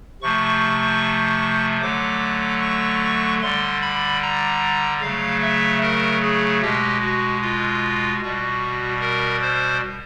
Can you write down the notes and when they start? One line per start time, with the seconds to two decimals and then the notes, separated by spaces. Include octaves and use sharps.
0.22 C3 F3 A3 C#6
1.82 D3 F#3 A3 D6
2.62 C#6
3.42 D3 G3 C6
3.82 B5
4.22 A#5
5.02 C#3 F#3 A3 F5
5.42 E5
5.82 A#4
6.22 G#4
6.61 B2 G#3 G4
7.01 F#4
7.41 F4
8.22 B2 G3 F#4
9.01 A#4
9.41 C5